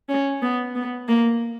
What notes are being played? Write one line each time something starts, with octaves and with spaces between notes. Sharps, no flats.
C#4
B3
B3
A#3